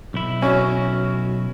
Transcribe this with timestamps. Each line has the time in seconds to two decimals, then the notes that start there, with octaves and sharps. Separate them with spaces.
0.14 B1 E4
0.42 C#4 F#4